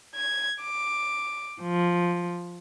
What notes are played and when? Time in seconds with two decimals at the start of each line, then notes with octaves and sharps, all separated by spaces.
0.14 G#6
0.61 D6
1.62 F3